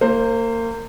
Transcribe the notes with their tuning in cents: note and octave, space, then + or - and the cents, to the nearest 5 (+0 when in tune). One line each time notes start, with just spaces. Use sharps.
A#3 -30 C5 +0